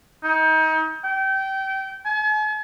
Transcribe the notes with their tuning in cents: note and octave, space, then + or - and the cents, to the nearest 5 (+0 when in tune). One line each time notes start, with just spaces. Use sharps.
D#4 +30
G5 -25
G#5 +45